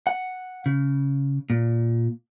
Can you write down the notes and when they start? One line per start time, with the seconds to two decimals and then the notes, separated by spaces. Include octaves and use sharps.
0.07 F#5
0.66 C#3
1.50 A#2